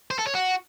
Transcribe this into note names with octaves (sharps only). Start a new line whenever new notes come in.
C5
A4
C#5
F#4